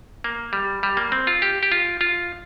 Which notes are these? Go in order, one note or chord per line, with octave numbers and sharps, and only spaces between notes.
A#3
G3
G3
A#3
C4
F4
G4
G4
F4
F4